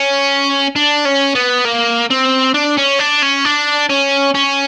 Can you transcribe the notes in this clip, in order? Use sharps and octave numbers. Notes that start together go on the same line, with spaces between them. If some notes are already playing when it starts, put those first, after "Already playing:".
Already playing: C#4
D4
C#4
B3
A#3
C4
D4
C#4
D4
C#4
D4
C#4
C#4